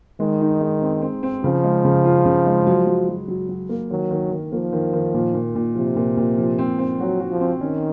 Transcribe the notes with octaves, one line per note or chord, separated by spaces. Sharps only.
D#3 G#3
D#4
G#3
C4
C4
C4
C#3 F3
G#3
C#3
F4
C#3
G#3
F#3
F#3
F#3
F#3
F#3
A#3
D#3 F#3
D#3
D#3
F3 A#3
D#3
D#3
A#2
A#2
A#2
C3 F3
A#2
A#2
F3
C4
C4
F#3 F#4
F#4
F3
C4
D#3 C#4